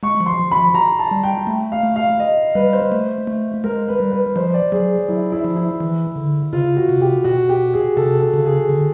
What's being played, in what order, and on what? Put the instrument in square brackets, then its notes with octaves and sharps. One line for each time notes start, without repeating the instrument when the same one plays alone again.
[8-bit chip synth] G#3 [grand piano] C#6
[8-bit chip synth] F3
[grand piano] C6
[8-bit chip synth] F3
[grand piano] B5
[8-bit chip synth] F3
[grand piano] A#5
A5
[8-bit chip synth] G3
[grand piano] G5
[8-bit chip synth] A3
[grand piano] F5
[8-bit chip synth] A3
[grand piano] F5
D#5
[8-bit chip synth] G3 [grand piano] B4
[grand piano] C5
[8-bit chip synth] A3
A3
[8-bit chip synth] G#3 [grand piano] A#4
[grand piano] B4
[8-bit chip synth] G3
[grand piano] B4
[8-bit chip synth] F3 [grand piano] C5
[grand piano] D5
[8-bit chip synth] F#3 [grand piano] G#4
[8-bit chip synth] F#3 [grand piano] E4
[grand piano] E4
[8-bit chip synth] F3
[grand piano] E4
[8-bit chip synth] E3
D3
[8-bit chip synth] C#3 [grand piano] F4
[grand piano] F#4
[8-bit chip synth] C3
[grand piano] G4
[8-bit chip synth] B2 [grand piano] F#4
[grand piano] G4
G#4
[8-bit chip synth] C3 [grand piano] A4
[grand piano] A4
[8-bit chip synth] C#3
[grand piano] G#4
[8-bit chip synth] D3